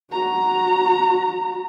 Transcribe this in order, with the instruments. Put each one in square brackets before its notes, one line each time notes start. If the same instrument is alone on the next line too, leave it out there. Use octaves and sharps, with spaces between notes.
[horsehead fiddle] F#4 A#5